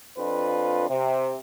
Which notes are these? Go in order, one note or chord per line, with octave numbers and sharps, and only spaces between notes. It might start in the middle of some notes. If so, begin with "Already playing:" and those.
F2 D4 F4 B4
C3